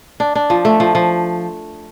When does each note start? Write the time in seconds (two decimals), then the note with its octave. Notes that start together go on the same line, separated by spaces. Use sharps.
0.20 D4
0.35 D4
0.50 F3
0.65 A3
0.80 F3
0.95 F3